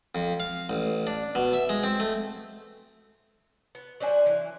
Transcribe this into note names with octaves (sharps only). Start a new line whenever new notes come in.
F2
F5
A1
D4
B2
E5
G#3
C4
A3
B3
F#3 D4 C5 G#5
E3